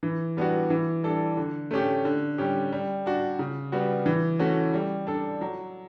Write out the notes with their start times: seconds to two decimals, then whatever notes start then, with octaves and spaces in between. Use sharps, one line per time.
0.03 E3
0.37 G3 B3 D4 F#4
0.70 E3
1.03 G3 D4 A4
1.37 D3
1.71 A3 C#4 G4
2.05 D3
2.38 G3 C#4 G4
2.72 G3
3.06 D4 F#4
3.39 C#3
3.72 G3 B3 F#4
4.06 E3
4.39 A3 C#4 F#4
4.74 G3
5.07 D4 A4
5.41 F#3